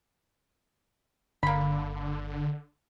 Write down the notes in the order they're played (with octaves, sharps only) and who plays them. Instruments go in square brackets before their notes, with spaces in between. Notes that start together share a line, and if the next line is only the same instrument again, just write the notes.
[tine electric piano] G1 [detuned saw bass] D3 [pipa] A#3 B5